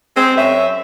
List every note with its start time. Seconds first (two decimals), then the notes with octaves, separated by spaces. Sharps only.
0.16 G#3 C4
0.36 F#2 C#4 E5